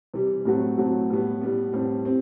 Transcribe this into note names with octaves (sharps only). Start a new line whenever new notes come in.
C3 E3 G3
A2 F#3 A3 C4 F#4
A2 F#3 A3 C4 F#4
A2 G3 B3
A2 G3 B3
A2 G3 C4
C4